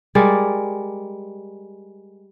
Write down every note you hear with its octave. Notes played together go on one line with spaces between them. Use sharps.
G3 G#3 A#4 D5